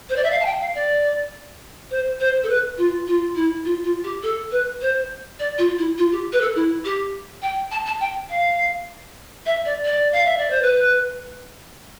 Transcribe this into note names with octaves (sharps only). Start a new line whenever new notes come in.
C5
D5
E5
F5
A5
G5
F5
D5
C5
C5
A4
B4
F4
F4
E4
F4
F4
G4
A4
B4
C5
D5
F4
E4
F4
G4
B4
A4
E4
G4
G5
A5
A5
G5
F5
E5
D5
D5
F5
E5
D5
C5
B4